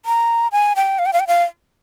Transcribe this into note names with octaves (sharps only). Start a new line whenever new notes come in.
A#5
G#5
G5
F5
G5
F5
G5
F5